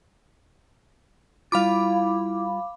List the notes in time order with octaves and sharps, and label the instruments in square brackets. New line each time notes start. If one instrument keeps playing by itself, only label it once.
[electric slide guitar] G3 F4 [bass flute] E4 [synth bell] F5 B5 D6